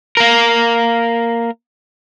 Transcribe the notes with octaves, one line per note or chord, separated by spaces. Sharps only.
A#3 A#4